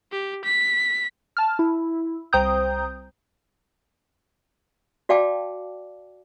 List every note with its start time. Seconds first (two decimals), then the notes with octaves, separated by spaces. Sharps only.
0.12 G4
0.44 B6
1.37 A5 F6
1.59 E4
2.33 C2 C5 G5 A#5 D#6 G6
5.09 F#4 D5 F5 G5 A5 D6